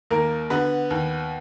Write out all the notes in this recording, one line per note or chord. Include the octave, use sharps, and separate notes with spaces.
D#2 A#3 A#4
D3 B3 B4
D#2